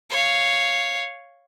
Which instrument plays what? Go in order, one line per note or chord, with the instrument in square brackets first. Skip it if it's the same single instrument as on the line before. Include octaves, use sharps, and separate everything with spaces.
[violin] C#5 F5